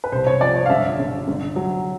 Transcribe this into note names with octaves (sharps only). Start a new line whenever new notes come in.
B4
C2 C5
C#5
F3 D5
C#5
F5
G1 E5
G1
G1
F#3